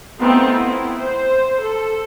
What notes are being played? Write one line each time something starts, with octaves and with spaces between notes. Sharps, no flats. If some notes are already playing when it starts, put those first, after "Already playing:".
A3 B3 C4 D#4 F4
E4
C5
A4